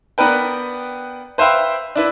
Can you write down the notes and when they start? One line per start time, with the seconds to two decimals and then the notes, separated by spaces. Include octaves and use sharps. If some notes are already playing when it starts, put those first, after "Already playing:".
0.18 B3 D4 A#4 B4 G5
1.38 B4 C5 E5 F5 G5 C6
1.96 D4 E4 B4